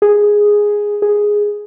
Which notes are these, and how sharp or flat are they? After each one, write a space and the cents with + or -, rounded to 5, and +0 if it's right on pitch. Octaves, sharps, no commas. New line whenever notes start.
G#4 -5
G#4 -5